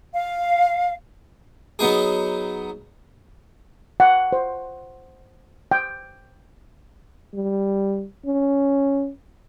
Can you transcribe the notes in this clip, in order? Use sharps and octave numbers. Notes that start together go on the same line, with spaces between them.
F5
F#3 B3 D#4 G#4
F#5
C5
G5
G3
C#4